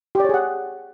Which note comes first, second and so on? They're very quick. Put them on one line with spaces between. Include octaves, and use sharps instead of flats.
G4 D5 C#5 G#4 F#5